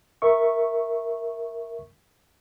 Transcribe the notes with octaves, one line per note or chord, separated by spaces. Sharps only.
A#4 E5 C#6